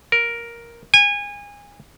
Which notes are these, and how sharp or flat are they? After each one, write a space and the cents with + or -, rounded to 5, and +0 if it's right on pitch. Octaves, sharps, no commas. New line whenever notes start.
A#4 +5
G#5 -25